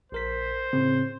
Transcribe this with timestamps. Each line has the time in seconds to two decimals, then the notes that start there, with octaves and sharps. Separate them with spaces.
0.12 A#1 A#4 C5 B6
0.73 A2 C#3 C4